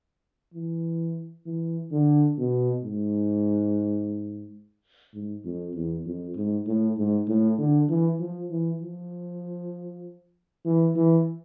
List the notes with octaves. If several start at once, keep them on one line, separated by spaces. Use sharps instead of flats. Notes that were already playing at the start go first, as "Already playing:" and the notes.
E3
E3
D3
B2
G#2
G#2
F2
E2
F2
G#2
A2
G#2
A2
D3
E3
F3
E3
F3
E3
E3